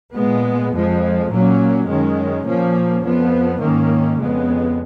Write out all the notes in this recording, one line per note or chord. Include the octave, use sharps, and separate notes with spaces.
A#2 G#3 B3
F2 F3 G#3
A#2 F#3 A#3 C#4
F#2 D#3 G#3 C#4
A#2 F3 A#3 C#4
F2 F3 B3
G#2 D#3 A#3 C#4
F2 C#3 G#3 B3